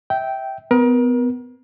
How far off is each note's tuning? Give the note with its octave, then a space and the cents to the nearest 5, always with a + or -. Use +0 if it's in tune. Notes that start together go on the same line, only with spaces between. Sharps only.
E5 -20 G5 -10
B3 +25 A#4 +35